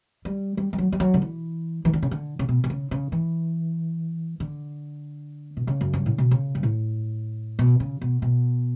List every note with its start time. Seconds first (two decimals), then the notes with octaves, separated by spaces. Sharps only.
0.25 G3
0.57 G3
0.73 G3
0.78 F#3
0.92 G3
1.00 F#3
1.14 D3
1.22 E3
1.85 E3
1.93 D3
2.02 C#3
2.11 D3
2.39 C#3
2.49 B2
2.64 B2
2.70 C#3
2.91 C#3
3.12 E3
4.40 D3
5.57 B2
5.67 C#3
5.81 F#2
5.93 G2
6.06 A2
6.18 B2
6.31 C#3
6.55 G2
6.63 A2
7.59 B2
7.80 C#3
8.01 B2
8.22 B2